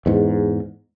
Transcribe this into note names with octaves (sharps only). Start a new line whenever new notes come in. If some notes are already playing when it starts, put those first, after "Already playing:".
E2 G#2